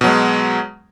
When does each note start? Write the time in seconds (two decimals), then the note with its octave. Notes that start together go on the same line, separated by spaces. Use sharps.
0.01 B2
0.04 F#3
0.07 G#3